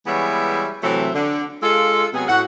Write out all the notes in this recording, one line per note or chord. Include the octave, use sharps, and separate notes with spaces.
E3 G3 G#3 B3 C#5 E5
C3 E3 F#3 A3 C5 E5
D3
G#3 F4 A4
C3 F#3 B3 G#4
A2 F#4 F#5